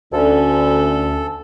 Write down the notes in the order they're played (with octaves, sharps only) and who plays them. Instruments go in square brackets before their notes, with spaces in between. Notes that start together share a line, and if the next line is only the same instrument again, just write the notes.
[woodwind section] D2 [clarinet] C#4 [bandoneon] A4